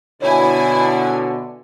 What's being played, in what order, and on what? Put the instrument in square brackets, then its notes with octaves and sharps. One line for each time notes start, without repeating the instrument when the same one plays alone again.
[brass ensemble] B2 D3 [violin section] E4 G#5 [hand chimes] C#5